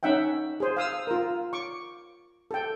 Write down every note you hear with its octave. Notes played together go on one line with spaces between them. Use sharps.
C#4 D#4 E5 F#5 G5
G#4 C5
F5 D#6 E6
F4 A#4
C#6 D6
A4 G5